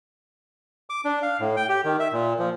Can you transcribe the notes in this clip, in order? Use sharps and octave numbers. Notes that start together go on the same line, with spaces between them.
D6
D4
F5
A2
G5
G4
D#3
E5
A#2
F3